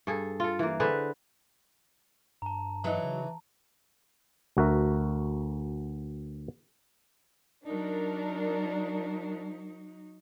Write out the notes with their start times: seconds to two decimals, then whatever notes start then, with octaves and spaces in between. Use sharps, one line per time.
0.07 G2 G#4 A4
0.40 F4 A4
0.59 E3 A#3
0.80 D3 G#4 B4 C5
2.42 G2 A5 A#5
2.84 E3 F#3 D#4
3.04 C#3
4.57 D2 F#4 A#4 E5
7.65 F#3 D4 D#4 A#4